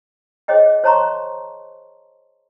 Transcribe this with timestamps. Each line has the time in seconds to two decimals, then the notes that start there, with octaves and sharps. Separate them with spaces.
0.48 G#4 C5 C#5 D#5 G5
0.84 C5 C#5 A5 A#5 C6 C#6